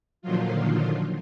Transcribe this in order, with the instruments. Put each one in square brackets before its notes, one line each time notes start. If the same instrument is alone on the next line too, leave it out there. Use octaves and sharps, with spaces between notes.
[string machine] A#2 D3 D#3 F3 F#3 F4